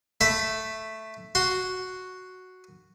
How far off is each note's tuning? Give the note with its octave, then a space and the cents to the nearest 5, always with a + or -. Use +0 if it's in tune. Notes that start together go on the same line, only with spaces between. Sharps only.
A3 +0 E5 +0 B5 +35
F#4 +0 C6 +0